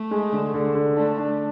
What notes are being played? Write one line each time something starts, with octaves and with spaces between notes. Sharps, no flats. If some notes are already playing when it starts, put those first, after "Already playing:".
Already playing: A3
G#3
D3
D3
D3
A3 D4
D4